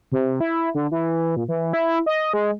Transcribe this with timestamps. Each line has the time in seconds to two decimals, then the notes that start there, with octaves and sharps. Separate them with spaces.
0.12 C3
0.41 E4
0.74 D3
0.91 E3
1.36 A#2
1.48 E3
1.73 E4
2.06 D#5
2.34 G#3